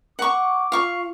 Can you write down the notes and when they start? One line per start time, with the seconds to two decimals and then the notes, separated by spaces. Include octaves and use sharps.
0.19 F#5 C#6 D6
0.72 F4 F5 C#6